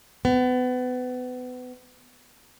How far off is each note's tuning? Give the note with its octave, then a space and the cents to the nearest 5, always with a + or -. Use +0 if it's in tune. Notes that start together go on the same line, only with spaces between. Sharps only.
B3 +30